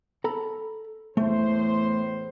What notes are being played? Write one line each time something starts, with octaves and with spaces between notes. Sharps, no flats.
A4 A#5 B5
E2 A2 A3 C5